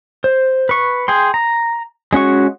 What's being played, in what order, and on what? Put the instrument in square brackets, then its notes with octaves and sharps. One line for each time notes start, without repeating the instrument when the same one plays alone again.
[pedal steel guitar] C5
B4 C#6
G#4 G5 C6
A#5
G#3 C#4 F#4 C#6